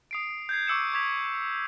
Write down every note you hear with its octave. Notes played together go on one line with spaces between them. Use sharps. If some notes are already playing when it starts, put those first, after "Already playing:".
D#6 C7 D7
G6 G#6 C7
C#6 D6 E6 C#7 E7
C#6 D6 G#6 B6 F7